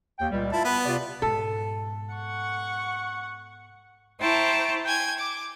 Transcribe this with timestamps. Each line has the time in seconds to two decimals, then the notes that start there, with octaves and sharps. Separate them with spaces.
0.19 D#2 G5
0.31 C#2 A#2 G3
0.52 E4 F4 E5 A5
0.64 B3 B4
0.85 C3 F4 D5
1.22 G#2 B2 A4
2.13 F#5 C#6
4.20 E4 C5 G5 A5 A#5 C#6
4.84 G5 G#5 G#6
5.17 D6